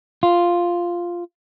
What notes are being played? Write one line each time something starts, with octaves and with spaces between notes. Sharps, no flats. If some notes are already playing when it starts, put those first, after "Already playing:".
F4